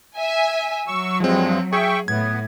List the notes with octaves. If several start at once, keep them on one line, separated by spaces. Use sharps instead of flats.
E5 G#5
F#3 C#6 E6
G2 F3 G#3 C4
G#4 E5 G5 C#6
A2 B3 G#6